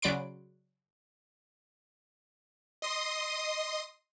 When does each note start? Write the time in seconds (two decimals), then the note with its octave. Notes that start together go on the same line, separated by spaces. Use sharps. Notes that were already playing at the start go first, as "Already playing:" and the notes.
0.02 C#3 F#3 D5 B5 C6 D7
2.82 D#5 C6 D#6